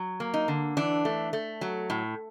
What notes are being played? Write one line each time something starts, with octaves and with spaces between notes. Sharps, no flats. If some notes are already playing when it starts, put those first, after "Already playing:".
Already playing: F#3
A#3
D#4
D3
E3 D4
A3
A3
F#3
A2